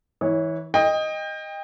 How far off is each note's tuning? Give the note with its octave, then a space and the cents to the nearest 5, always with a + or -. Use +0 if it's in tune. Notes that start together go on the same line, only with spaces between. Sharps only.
E3 -25 C#5 +0
D#5 +0 G5 +25